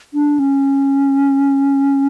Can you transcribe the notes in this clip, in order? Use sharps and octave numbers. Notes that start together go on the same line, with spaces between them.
D4
C#4